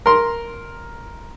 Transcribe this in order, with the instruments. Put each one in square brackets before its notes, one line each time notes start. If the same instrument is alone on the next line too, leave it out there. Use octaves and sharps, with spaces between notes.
[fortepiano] A#4 C6